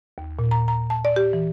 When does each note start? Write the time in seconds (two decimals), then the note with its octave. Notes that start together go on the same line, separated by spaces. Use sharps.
0.18 D#2
0.39 A#2
0.51 A#5
0.68 A#5
0.90 A5
1.05 D5
1.16 G4
1.33 E3